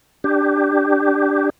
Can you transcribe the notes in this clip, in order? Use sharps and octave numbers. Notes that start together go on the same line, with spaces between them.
D4 G4